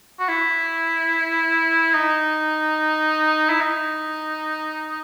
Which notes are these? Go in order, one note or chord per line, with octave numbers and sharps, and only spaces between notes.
F#4
E4
D#4
E4
D#4